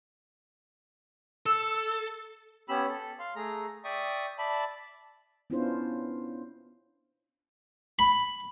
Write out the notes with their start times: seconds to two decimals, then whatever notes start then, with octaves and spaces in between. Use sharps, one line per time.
1.46 A4 E6
2.69 B3 C#4 G4 B5 E6
2.89 A4
3.19 F5 C6
3.36 A3 G#4 A#5
3.84 D5 E5 G5 C#6 D#6
4.38 D5 E5 A5 B5
5.50 B3 C#4 D4 E4 F4 C5
7.99 B5